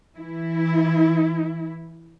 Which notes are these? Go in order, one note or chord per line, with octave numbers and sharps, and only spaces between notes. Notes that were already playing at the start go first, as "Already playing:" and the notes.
E3 E4